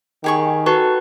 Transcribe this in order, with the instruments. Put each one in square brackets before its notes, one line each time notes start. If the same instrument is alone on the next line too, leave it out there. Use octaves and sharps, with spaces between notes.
[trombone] D#3 [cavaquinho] G4 G#4 C#6
[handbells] F#4 B4 C#6 [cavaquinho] A4